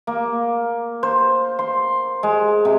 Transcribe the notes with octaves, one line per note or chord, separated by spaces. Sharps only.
A#3
C5
C6
G#3
C3